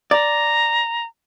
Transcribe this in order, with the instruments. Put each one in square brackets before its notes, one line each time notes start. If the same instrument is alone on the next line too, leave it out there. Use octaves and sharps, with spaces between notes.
[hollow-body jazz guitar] D5 [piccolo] A#5